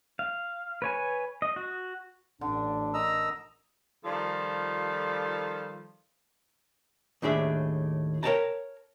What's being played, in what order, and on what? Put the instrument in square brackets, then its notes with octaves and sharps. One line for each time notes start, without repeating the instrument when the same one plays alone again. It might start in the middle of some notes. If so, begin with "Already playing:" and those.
[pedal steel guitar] F5
B4 C#5 G#5
D#5
F#4
[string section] A1 [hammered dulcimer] D3 [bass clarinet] D4
[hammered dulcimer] A#4 [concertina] D#5 A#5 E6
[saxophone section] D#3 F3 G3 F4 A4
[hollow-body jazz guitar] D#2 A2 D4 G#4 E5
A#4 C#5 D5 G5 A5 A#5